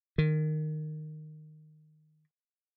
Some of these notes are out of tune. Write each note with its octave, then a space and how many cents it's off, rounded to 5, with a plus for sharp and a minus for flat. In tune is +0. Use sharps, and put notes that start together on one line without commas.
D#3 -15